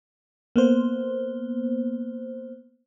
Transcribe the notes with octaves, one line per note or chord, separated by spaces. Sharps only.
A#3 B3 C5